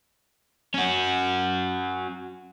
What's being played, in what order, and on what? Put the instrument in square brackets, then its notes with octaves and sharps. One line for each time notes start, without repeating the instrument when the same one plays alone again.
[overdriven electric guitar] C#4 F#4